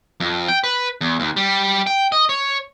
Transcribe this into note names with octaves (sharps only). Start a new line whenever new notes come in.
F2
G5
B4
E2
D#2
G3
G5
D#5
C#5